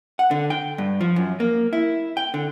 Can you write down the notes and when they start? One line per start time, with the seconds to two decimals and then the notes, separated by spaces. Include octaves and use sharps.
0.19 F#5
0.31 D3
0.50 G5
0.78 G2
1.01 F3
1.16 F#2
1.40 A#3
1.73 E4
2.17 G5
2.34 D3